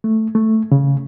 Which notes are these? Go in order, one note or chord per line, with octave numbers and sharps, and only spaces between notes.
A3
A3
C#3